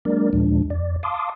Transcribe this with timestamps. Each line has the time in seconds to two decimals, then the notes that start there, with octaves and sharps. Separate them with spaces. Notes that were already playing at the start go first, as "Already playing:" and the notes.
0.05 F#3 G#3 A#3 D4 A#4 D5
0.33 D#2 A#2 F3 G#3 D4
0.70 F2 D5
1.03 F5 A5 C6 D6 D#6